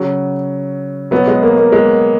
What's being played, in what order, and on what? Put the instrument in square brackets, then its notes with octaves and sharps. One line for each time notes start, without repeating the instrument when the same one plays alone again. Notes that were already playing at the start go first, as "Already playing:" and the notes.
Already playing: [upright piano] C#3 F#3
B2 F#3 B3
G#3
A#3
A#3
G#3